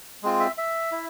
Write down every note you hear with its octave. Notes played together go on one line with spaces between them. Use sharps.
G#3 C4 F4
E5
E5
E4